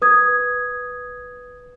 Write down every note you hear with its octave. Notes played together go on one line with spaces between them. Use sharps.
B4 D#6 G#6